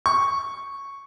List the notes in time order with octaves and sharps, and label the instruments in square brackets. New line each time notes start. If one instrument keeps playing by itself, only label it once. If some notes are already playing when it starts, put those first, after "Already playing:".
[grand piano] C#6